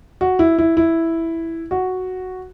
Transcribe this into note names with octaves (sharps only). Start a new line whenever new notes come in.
F#4
E4
E4
E4
F#4